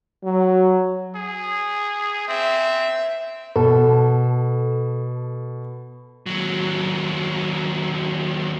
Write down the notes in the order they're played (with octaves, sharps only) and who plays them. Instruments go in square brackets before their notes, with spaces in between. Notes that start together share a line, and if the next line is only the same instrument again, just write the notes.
[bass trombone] F#3
[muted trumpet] G#4
[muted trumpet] C4 [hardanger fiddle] E5
[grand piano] B2 [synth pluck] A4
[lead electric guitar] D#2 F#3